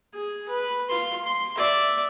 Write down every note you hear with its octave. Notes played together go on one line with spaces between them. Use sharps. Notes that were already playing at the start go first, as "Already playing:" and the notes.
G#4
B4
F4 C6
C6
D5 E5